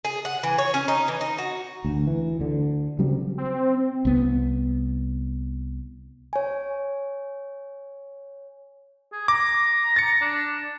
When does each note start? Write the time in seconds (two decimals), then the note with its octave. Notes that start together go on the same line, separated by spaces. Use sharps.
0.04 G#4
0.25 F#5
0.43 E3
0.58 C#5
0.74 C#4
0.88 D#4
1.08 E3
1.21 D#4
1.38 F#4
1.85 D2
2.07 E3
2.39 D2 D3
2.99 C#3 F#3 G3 C4
3.38 C4
4.05 C2 B3
6.33 C#5 G#5
9.12 G#4
9.28 A#5 D6
9.96 A6 C#7
10.21 D4